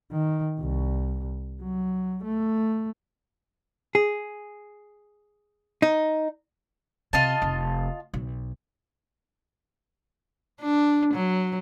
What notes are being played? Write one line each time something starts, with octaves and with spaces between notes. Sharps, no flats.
D#3
C2
F#3
A3
G#4
D#4
C3 F4 D#5 A5
F1
B1
D4
F#3